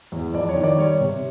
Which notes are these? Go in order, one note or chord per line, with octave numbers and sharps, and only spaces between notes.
E2
F2 D5
C#5
D#3
D5
G3 C#5
C3